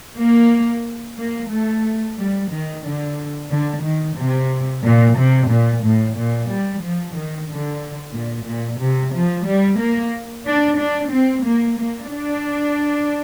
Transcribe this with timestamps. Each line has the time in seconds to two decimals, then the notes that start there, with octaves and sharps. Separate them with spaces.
0.19 A#3
1.18 A#3
1.51 A3
2.17 G3
2.50 D#3
2.83 D3
3.50 D3
3.83 D#3
4.17 C3
4.83 A#2
5.16 C3
5.48 A#2
5.82 A2
6.15 A#2
6.48 G3
6.82 F3
7.14 D#3
7.48 D3
8.14 A#2
8.46 A#2
8.79 C3
9.13 F3
9.46 G3
9.79 A#3
10.46 D4
10.78 D4
11.12 C4
11.45 A#3
11.78 A#3
12.11 D4